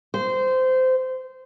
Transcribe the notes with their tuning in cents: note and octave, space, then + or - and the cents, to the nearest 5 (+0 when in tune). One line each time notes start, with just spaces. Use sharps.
C5 -20